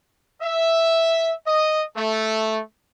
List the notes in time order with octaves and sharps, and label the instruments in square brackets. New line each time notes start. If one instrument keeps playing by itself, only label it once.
[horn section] E5
D#5
A3